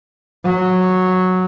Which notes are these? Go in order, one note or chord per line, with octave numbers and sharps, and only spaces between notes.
F#3